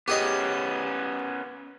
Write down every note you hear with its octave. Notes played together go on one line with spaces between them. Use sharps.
B3 C#4 G4 G#4 D#5